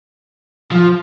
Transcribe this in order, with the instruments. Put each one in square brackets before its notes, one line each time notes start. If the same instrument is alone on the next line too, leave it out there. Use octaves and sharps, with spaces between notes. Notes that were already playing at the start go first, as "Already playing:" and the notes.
[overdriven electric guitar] F3 [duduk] F4